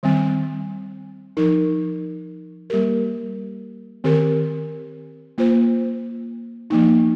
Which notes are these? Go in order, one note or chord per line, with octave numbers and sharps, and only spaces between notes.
D#3 G3 C4
F3 D#4 A#4
G3 A#3 G4 A#4
D#3 C4 G4 A#4
A#3 F4 C5
F3 A#3 D#4